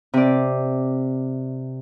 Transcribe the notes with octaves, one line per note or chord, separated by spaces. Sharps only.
C3 D5